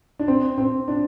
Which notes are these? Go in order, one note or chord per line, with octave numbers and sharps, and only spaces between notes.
D4
C4
C4
D4